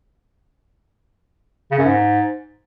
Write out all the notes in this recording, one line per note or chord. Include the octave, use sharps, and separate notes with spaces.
C#3
F#2
G#2